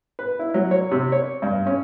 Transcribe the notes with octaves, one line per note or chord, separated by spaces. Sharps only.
B4
E4
F#3
C#5
C3
C#5
G2
C#4